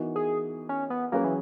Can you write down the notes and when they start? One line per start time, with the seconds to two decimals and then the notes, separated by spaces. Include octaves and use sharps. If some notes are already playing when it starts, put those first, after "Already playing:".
Already playing: E3 B3 D#4 F#4 A#4
0.16 G#4
0.69 C#4
0.90 B3
1.12 F#3 A#3 C#4 G#4 B4
1.24 E3